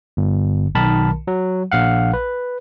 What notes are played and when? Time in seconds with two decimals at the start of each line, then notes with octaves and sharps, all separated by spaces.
0.17 G1
0.75 B1 D#3 A#4 A5 B5
1.27 F#3
1.72 A#1 F5 F#5
2.13 B4